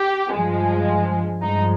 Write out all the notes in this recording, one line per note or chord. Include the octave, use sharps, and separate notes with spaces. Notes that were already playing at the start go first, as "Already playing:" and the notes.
Already playing: G4
G2 F3 G#3
G2 F3 G#3 D#4